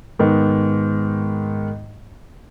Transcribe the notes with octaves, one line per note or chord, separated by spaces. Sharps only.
G#2 D#3 B3